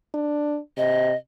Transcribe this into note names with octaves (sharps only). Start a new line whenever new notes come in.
D4
C3 D#5